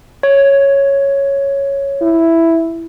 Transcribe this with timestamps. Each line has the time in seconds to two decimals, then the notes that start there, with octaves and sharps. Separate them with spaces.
0.23 C#5
2.02 E4